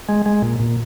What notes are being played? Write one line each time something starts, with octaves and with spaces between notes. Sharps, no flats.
G#3
G#3
A#2
A#2